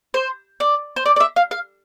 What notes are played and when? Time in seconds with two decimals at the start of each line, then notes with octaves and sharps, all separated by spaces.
0.14 C5
0.60 D5
0.96 C5
1.06 D5
1.16 D5
1.20 E5
1.36 F5
1.51 F5